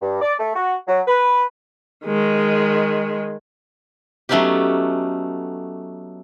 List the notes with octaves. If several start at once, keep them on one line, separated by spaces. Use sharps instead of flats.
G2
D5
A3
F#4
F#3
B4
D#3 G#3
F#3 A3 B3 C#4 D#4 G4